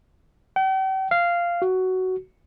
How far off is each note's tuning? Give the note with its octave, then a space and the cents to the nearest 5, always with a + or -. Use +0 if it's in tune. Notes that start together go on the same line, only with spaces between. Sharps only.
G5 -45
F5 -10
F#4 +10